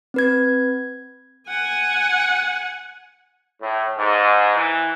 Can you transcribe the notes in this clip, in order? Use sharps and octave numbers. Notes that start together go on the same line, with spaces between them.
C4 B4 G#6
F#5 G#5
A2
G#2
E3